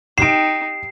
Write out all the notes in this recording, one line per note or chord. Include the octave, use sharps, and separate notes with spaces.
D#4 G4 F6 C7 D7 E7